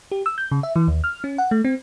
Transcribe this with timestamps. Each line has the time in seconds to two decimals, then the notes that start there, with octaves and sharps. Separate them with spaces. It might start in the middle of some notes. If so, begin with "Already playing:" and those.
0.12 G4
0.26 E6
0.38 G6
0.52 C#3
0.63 E5
0.76 E3
0.88 D#2
1.04 F6
1.24 C#4
1.38 F#5
1.51 A3
1.65 C4